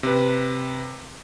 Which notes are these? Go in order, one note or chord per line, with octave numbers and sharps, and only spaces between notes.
C3 B4